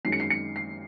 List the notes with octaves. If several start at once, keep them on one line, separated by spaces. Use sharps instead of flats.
F#2 D#3 G#3 C#4 C7
C#7
C7
C#7
C7